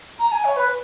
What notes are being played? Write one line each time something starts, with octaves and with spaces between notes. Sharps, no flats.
A#5
G#5
C#5
B4